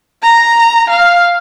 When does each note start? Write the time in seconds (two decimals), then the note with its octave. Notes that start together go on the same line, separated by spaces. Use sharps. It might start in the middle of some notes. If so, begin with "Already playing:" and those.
0.23 A#5
0.90 F5